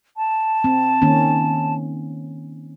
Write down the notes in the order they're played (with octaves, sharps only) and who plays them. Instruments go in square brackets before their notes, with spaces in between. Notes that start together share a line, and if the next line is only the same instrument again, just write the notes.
[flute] A5
[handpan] C4
D#3 A#3 C#4